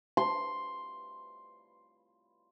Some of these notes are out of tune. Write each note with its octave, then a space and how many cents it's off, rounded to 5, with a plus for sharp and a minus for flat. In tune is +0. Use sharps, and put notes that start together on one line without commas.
C6 +5